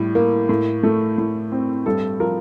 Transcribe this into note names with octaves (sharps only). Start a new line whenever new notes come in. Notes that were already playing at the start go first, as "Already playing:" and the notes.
Already playing: A2 G3
A#3
A2
A3
A2
C4
G2 A4
F3 A#4